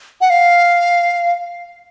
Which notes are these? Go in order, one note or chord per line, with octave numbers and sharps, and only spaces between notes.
F#5
F5